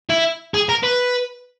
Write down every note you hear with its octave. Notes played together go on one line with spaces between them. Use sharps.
E4
G#4
A#4
B4